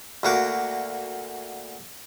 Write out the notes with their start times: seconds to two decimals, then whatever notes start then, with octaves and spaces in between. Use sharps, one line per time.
0.23 D2 A#3 F#4 D6